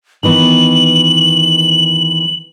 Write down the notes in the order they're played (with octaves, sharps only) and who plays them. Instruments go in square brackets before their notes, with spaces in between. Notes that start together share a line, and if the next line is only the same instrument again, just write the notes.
[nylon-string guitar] D#3 E3 B3 [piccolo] F#7